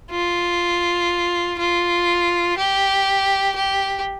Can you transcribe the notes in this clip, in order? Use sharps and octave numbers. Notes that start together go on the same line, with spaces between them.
F4
F4
G4
G4